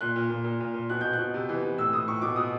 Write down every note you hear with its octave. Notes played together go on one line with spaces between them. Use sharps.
A#2 F#6
A#2
A#2
A#2
A#2
A#2
B2 F#6
B2 G6
B2 F#6
C3
E3
E3
A2 E6
A2 D#6
A2 C#6
B2 D6
B2 D#6